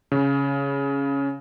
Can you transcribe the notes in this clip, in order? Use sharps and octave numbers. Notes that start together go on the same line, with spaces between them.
C#3